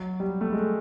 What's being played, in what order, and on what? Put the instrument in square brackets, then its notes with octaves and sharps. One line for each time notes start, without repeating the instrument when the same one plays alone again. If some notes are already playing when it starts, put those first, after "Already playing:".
Already playing: [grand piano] F#3
G3
A3
G#3